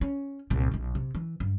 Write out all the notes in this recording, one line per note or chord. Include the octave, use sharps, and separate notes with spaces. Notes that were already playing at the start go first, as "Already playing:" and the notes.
C#4
C2 A#2
B1 B2
C3
E3
G2